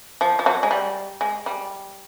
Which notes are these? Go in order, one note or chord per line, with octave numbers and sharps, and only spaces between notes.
F3
F3
F#3
G#3
G3
G#3
G3